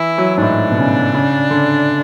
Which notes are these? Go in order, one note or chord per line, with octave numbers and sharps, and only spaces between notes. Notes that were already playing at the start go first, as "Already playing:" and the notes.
Already playing: E3 E4
F#3
G#2
A2 D4
B2
C#3
C#3
D3